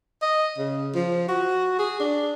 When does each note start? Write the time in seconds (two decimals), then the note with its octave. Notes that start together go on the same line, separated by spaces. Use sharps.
0.22 D#5
0.58 C#3
0.94 F3
1.28 F#4
1.79 G#4
2.00 D4